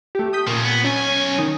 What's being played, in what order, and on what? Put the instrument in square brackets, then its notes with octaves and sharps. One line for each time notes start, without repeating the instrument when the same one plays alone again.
[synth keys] A3 G4
D#6 G6 B6
[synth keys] A#2 [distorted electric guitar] F3 C#4
[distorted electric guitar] B3
[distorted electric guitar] B1 G#5 [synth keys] C#4
[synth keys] D#3 D#4